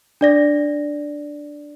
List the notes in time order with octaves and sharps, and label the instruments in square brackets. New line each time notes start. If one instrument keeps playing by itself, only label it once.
[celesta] D4 D5 A#6